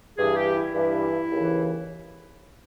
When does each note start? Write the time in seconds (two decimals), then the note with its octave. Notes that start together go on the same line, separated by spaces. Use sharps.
0.18 G2 E3 G#4
0.36 G4
0.56 E4
0.74 G2 E3
1.29 D#2 C#3 E3